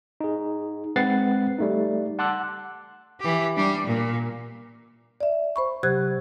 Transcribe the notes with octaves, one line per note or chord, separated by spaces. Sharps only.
D#4 G#4
G#3 C4 B4 F#5 A6 C7
G3 A3 D#4
F#5 A5 C6 D6 E6 F#6
E3 G4
G3 D4
A#2
D5 E5
C5 B5 C#6
C3 F#3 G4 C5 F#6 G#6